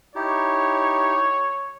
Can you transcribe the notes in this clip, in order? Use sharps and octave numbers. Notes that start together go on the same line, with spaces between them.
D#4 E4 G4 C#5